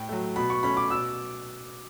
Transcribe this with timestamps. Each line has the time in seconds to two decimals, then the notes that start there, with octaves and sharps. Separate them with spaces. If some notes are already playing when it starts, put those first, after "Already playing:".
Already playing: A2 G5
0.09 F#3 A3
0.36 B2 B5
0.50 C#6
0.63 A3 C#4 B5
0.77 D6
0.90 B2 E6